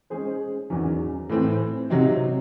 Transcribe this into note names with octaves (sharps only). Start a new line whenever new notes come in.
G#3 C#4 G#4 C5
E2 D#3 F#3 C#4
A2 E3 C4
C3 F#3 C4 D#4